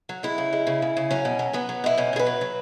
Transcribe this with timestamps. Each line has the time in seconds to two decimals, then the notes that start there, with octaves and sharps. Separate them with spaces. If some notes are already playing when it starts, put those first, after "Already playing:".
0.09 F#3
0.23 G#3 E4
0.38 C#3
0.53 G#3
0.67 C#3
0.82 C#3
0.97 C#3
1.11 F#3 C#4
1.25 B2
1.39 F#3
1.53 F#3 B3
1.69 F#3
1.84 B2 E4
1.97 B2 C#4
2.13 B2 G#4
2.19 B4
2.27 F#3
2.41 F#3